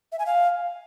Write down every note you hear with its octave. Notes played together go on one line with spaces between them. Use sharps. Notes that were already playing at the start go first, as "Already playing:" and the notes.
E5
G#5
F5